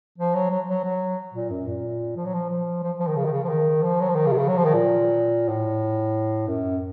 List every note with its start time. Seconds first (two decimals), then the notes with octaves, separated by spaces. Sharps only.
0.18 F3
0.34 F#3
0.50 F#3
0.70 F#3
0.84 F#3
1.34 A#2
1.50 F#2
1.67 A#2
2.16 F3
2.25 F#3
2.34 F3
2.50 F3
2.83 F3
2.99 F3
3.07 D#3
3.16 C#3
3.25 D#3
3.32 C#3
3.44 F3
3.48 D#3
3.82 F3
4.00 F#3
4.08 F3
4.15 D#3
4.26 C#3
4.32 C3
4.38 C#3
4.48 F#3
4.57 F3
4.65 D#3
4.73 A#2
5.48 A2
6.47 F#2